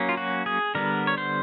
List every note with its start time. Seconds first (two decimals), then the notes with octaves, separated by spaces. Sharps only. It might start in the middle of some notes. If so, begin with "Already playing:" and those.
Already playing: F#3 A#3 C#4
0.09 F4
0.17 F#4
0.46 G#4
0.75 D3 G3 B3 A#4
1.07 C#5
1.18 C5